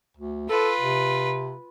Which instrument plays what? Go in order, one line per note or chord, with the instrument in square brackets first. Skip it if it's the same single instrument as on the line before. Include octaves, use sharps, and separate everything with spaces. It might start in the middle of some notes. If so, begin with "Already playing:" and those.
[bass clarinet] D2
[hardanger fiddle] F4 B4 [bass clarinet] A4
[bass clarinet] C3